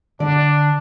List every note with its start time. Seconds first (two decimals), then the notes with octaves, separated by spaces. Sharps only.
0.20 D3 D4 D5